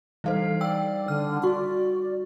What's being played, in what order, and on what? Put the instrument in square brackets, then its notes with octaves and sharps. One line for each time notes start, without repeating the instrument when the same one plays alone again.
[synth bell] E3 A4 C5 [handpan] G3 D#4 F5
[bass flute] D5 [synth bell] G5 E6
[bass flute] D3 [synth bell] F6
[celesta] F#4 [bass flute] D5 [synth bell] C#6